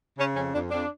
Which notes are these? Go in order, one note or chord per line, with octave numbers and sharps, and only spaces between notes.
C#3 C#4
F2 C#4
F2 D4
F2 D4